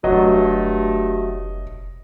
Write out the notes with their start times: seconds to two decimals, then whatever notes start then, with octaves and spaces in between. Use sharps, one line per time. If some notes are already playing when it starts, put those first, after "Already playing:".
0.04 F1 G2 F#3 A3 D#5